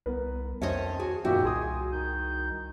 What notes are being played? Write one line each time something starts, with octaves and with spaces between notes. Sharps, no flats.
C2 B3 A#4 B4
F2 D#3 C#4 C5 C#5 D#5 E5 A5
F#4 G#4
G#1 F#2 A#2 F3 F#4 G4 E5 G5
C2 G#4 G#5 C6 D#6
D#3 D#4 G6